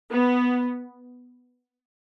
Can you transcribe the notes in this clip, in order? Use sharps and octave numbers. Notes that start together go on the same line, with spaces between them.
B3